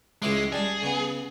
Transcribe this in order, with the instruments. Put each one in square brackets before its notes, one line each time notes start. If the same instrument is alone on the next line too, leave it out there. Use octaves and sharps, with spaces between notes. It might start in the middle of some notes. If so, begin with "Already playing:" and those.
[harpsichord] C#2 E4 D6 [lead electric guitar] G#3
[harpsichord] G3 A5 [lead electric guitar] G#4
[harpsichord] C#3 B3